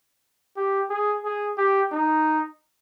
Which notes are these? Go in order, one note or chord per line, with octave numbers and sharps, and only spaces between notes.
G4
G#4
G#4
G4
D#4